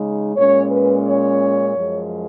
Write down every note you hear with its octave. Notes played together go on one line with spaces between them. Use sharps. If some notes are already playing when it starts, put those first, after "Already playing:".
Already playing: C#3 G#3 D#4
A#2 G#3 C#4 C#5
B4
C#5
F#2 F3 G#3